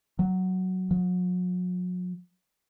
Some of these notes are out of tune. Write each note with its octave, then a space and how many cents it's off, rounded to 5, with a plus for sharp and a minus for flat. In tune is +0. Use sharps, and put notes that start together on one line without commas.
F#3 +5
F#3 -40